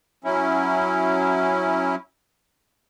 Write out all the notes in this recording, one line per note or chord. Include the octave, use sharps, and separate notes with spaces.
F#3 C#4 E4